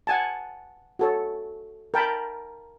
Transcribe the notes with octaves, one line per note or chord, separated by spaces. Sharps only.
F#5 G#5 A5
F#4 A4 C#5
A#4 G5 A5 B5